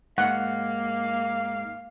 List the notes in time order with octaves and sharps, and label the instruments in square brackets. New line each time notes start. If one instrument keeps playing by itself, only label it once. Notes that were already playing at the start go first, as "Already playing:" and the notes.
[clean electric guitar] G#2 [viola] A#3 [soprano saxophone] F5 [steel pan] F#5